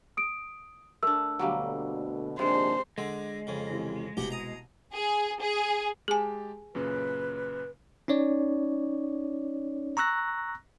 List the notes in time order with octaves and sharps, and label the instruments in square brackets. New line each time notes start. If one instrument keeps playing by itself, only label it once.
[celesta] D#6 D7
[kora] A3 D4 [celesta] A#4 E6
[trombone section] D2 B2 D3 [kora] F#3 G3 A#3
[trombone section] A#1 D#2 D4 [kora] C3 G#3 [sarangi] C5
[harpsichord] D3 [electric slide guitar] G#3
[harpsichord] F2 C#3
[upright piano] C3 E3
[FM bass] F1 [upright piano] C2 B2 [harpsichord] G4 F#5 G5
[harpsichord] A#5 D#6
[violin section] G#4
G#4
[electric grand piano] G#3 G4 A5 [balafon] G#4 G#5
[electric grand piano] F#2 A#2 C#3 [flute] B4
[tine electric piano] C#4 D#4 C#5 D5
A#5 C#6 E6 F#6 A#6